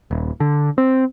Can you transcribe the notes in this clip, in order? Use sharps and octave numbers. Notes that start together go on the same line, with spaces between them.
D#1
D3
C4